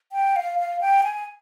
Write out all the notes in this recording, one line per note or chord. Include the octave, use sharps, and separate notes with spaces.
G5
F5
F5
G5
G#5